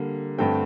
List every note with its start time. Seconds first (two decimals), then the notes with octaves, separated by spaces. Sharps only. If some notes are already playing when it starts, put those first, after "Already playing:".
Already playing: D3 G3 A#3
0.38 G2 D3 A3 C4 G5